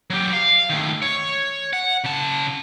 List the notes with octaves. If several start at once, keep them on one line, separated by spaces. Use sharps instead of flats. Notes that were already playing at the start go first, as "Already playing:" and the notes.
F#3 G4
F5
D#3 A3
C#5
F#5
C#3 A5